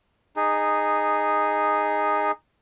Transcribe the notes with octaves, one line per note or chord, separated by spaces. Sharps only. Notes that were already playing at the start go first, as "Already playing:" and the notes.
D#4 G#4